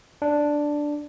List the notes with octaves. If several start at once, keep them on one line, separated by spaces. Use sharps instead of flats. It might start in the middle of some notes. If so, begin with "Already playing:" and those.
D4